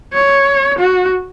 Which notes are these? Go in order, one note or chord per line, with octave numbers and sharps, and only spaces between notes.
C#5
F#4